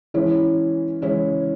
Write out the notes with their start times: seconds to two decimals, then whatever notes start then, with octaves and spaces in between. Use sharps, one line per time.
0.14 E3 G#3 C#4 E4
1.02 E3 G#3 C#4 E4